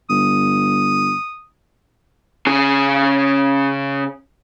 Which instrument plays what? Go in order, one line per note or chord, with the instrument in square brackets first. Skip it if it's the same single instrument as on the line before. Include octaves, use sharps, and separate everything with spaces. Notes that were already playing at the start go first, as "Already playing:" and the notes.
[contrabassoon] G1 [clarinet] D#6
[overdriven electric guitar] C#3 G#4